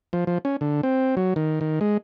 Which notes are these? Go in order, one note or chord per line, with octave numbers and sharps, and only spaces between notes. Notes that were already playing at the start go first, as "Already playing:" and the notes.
F3
F3
C#4
D3
C4
F#3
D#3
D#3
G#3